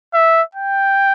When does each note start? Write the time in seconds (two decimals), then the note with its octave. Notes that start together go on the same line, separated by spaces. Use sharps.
0.14 E5
0.55 G5